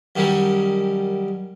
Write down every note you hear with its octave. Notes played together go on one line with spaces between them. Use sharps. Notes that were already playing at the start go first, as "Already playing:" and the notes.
F#2 D#3 G3 C#4